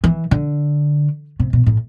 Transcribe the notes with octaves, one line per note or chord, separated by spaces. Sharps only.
E3
D3
C3
B2
A2